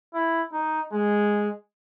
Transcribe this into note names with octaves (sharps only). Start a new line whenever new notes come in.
E4
D#4
G#3